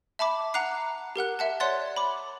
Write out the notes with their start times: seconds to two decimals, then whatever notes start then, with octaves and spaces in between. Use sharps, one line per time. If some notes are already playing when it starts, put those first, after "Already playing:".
0.19 E5 A5 B5 D6
0.54 F#5 A#5 D6 F#6 C7
1.16 G4 A#4 F#5 F#6
1.39 E5 F#5 A5
1.60 C#5 D5 F#5 C6 F#6 A6
1.96 B5 D6